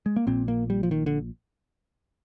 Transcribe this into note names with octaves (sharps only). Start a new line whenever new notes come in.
G#3
A#3
A#1 A#2 C4
A#3
G3
F3
D#3
D3